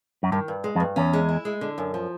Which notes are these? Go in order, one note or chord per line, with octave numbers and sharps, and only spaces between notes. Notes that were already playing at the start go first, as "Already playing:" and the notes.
F#2
G2 D#3
G2
G#3
F2
G2
E2 C#4
G#3
E4
G#3
D3
F#2
F3